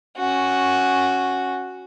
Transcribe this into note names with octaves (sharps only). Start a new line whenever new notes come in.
C#4 F#4